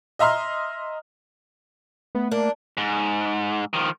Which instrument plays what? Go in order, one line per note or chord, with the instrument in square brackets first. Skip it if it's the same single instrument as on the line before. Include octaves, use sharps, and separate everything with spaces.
[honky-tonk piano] D#5 E5 A#5 C6 F6
[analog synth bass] A3 [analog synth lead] B3
[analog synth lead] A#3 [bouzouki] D4
[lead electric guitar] G#2
D#3 F3